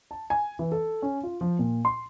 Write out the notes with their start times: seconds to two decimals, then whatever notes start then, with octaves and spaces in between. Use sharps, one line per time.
0.11 A5
0.30 G#5
0.59 E3
0.72 A4
1.02 C#4
1.23 F4
1.41 F3
1.59 A#2
1.85 C6